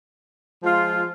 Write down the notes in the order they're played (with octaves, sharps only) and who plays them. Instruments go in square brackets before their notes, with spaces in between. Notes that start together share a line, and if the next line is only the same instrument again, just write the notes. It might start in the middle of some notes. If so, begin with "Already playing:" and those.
[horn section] F3 G#3 F4